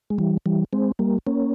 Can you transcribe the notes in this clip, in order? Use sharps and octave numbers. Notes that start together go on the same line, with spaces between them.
G#3
E3 G3
E3 G3
G#3 C4
G3 A#3
A#3 C#4